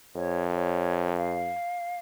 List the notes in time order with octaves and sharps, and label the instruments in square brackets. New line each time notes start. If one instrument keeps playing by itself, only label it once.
[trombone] F2 [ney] C#5
[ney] C#5
F5